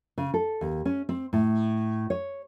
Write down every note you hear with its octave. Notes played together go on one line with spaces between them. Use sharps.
C#3
A4
D#2
C#4
C4
A2
C#5